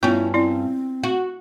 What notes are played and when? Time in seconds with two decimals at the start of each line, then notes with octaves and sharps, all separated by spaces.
0.03 G2 B3 C#4 E4 F4
0.34 C4 E4 D5
1.04 F#4